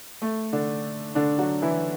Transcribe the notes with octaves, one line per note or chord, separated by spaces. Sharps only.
A3
D3 D4
D3 D4
F#3 F#4
E3 E4